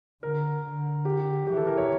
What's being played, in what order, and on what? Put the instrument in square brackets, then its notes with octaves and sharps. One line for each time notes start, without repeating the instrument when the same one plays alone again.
[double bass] D3 [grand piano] A#4
[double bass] D3
[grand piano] G4
[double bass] E3 [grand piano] G4
[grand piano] A4
A#4
C#5